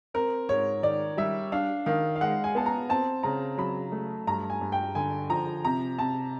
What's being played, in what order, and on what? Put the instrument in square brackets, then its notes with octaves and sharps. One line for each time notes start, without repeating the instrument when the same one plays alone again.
[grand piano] C4 [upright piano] A#4
[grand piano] G#2 [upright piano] C#5
[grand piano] D#3 [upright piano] D5
[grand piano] G3 [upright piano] E5
[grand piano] D4 [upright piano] F5
[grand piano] D#3 [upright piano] F5
[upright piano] F5
[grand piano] G#3 [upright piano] F#5
[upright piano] G#5
[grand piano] B3 [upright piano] A5
[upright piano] A#5
[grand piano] C4 [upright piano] A5
[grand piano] C#3 [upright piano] A#5
[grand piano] F#3 [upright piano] B5
[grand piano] A3
[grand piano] G2 [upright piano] A#5
[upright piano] G#5
[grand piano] G2
[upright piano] G5
[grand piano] D3 [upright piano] G#5
[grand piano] F3 [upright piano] A#5
[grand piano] C3 [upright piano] A#5
[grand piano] C3 [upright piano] A5